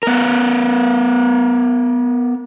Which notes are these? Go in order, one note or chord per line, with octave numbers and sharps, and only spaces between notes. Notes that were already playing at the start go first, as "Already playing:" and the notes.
B3 A#4